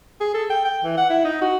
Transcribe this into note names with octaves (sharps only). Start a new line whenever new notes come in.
G#4
A4
G5
G5
E3
F#5
E4
D#4
F#4